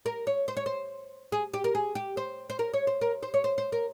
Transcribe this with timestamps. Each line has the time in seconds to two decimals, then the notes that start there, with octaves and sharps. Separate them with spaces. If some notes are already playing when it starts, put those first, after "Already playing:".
0.06 A#4
0.27 C#5
0.48 C5
0.57 C#5
0.66 C5
1.32 G#4
1.54 G4
1.64 A#4
1.75 G#4
1.95 G4
2.17 C5
2.50 C5
2.59 A#4
2.74 C#5
2.87 C5
3.01 A#4
3.23 C5
3.34 C#5
3.44 C5
3.58 C5
3.72 A#4